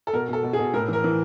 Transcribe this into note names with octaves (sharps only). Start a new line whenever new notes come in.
A4
B2 A#4
B2 A4
B2
G#4
B2
A2 A#4
E3 A#4
E3